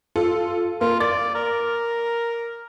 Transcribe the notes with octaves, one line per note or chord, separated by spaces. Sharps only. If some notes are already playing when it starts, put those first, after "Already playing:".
F4 A4
A#3 F4
D5 A6
A#4